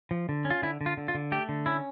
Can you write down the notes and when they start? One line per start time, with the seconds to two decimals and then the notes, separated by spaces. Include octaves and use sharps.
0.11 F3
0.29 D3
0.45 C#4
0.50 F4
0.62 D3 E4
0.81 D3
0.86 F4
0.97 D3
1.08 F4
1.15 D3
1.32 A3 G4
1.49 D3
1.66 C#4 E4